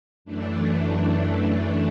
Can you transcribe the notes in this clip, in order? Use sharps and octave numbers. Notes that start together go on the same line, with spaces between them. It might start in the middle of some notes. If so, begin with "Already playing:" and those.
F#2 E3 A3 D4